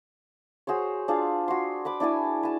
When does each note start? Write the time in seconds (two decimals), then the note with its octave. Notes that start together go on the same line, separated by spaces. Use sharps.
0.67 F#4 G#4 C5 C#5
1.08 D4 F4 G#4 F5
1.48 F#4 C6
1.85 B4 B5 D6
2.00 D4 E4 D5 G#5
2.43 B4 A5